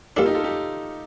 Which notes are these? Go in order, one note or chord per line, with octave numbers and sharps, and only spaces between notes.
A#2 G3 D4 F4 A4
D#4 G4
F4 A4
D#4 G4